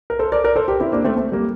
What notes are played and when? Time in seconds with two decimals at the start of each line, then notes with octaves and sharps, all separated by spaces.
0.10 A#4
0.19 A4 C5
0.32 A#4 D5
0.44 A#4 D5
0.56 A4 C5
0.68 G4 A#4
0.80 C4 E4
0.92 A#3 D4
1.04 A3 C4
1.17 A3
1.32 G3 A#3